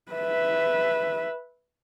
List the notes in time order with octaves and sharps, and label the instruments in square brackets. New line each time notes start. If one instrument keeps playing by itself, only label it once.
[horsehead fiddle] B4 E5